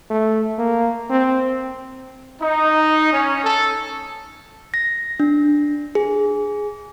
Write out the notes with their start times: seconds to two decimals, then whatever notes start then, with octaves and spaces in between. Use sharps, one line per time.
0.10 A3
0.58 A#3
1.10 C4
2.41 D#4
3.12 C#4
3.44 A4
4.74 A#6
5.20 D4
5.95 G#4